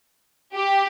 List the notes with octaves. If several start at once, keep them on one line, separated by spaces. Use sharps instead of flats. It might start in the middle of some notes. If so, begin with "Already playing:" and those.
G4